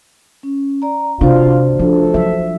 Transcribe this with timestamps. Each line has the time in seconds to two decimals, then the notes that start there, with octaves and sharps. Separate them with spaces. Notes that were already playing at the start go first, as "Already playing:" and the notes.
0.43 C#4
0.82 D5 A#5
1.21 C3 D4 F4 F#4 C5
1.79 C#2 F3 A3 D4 A4
2.14 F#3 E5